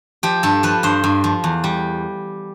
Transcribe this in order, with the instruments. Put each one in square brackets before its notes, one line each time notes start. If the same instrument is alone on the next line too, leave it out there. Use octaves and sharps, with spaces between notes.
[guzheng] F3 G4
G2 A4
F3 B4
G2 C5
G2
F3
E2
G3